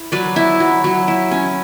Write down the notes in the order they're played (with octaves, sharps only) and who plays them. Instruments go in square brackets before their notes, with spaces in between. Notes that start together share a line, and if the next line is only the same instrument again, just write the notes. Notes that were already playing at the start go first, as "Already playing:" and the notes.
Already playing: [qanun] E4
F#3 B4 D5
E4
F#3
F#3
E4
C#4